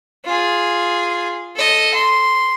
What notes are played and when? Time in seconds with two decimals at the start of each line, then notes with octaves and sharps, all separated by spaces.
0.25 F4 G#4
1.56 A4 D#5
1.94 C6